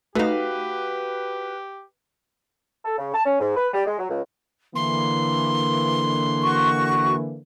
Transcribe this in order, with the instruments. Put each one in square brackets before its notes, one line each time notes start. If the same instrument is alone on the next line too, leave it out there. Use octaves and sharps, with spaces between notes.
[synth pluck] A3 D#4 [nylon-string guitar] F#4 F5 [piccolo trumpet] G4 [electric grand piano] B4
[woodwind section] A4
C#3
A5
C#4
G#2
B4
G3
G#3
F#3
C#2
[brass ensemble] D3 E3 A#3 [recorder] C6
[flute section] F#4 C#6